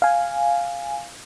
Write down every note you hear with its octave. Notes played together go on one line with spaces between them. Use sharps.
F5 G#5